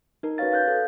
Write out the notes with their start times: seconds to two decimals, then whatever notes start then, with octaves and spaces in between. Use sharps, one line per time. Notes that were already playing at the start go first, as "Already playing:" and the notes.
0.23 D#4 A#4
0.38 C#4 F#4 B4 C#5 F5 A6
0.52 F5 F#6 G6
0.68 A4